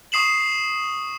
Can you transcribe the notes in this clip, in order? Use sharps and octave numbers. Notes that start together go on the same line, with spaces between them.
C#6 D#6 C7 E7 F#7